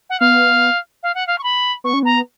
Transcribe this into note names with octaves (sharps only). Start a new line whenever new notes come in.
F#5
B3 F5
F5
F#5
F5
C#6
B5
B3 C#6
C#4
B3 A#5